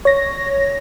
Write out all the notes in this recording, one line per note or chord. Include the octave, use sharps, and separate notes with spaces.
C#5 A#6